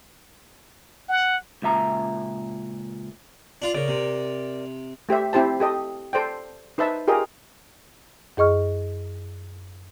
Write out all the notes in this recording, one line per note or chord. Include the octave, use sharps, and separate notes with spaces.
F#5
C#2 A#2 E5 A#5
D4 F4
C#3 A#4 D5
C3
A3 G4 C5 E5
C4 E4 G4 C5 A5
G4 A4 D#5
A4 C5 D5 G5
D#4 B4 C5 E5 A5
F4 G4 G#4 A#4 D#5
F#2 G#4 D#5 C#6 F6